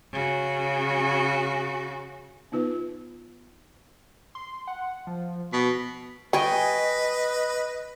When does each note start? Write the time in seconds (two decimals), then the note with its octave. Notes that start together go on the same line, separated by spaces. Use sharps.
0.12 C#3 F#4
2.52 B3 D#4 F4 B4
4.35 C6
4.68 F#5
5.07 F3
5.53 B2 B6
6.33 G3 B4 D#5 G5 G#5 C#6